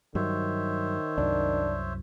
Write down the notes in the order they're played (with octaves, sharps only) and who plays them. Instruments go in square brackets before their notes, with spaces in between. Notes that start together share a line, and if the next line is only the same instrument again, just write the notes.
[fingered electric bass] G2 F#3 [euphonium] D#3 [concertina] C5 C#5 E5
[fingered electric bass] C2 F#2 [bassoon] D4